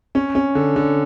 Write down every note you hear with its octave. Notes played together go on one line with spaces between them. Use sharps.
C#4
C#4
D3
D3